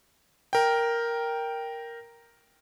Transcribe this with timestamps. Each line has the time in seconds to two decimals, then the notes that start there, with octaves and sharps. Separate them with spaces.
0.53 A#4 G5